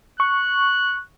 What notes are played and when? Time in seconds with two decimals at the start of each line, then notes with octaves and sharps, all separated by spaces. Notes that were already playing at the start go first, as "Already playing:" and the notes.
0.20 C#6 F#6